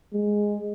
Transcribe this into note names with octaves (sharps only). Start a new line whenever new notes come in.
G#3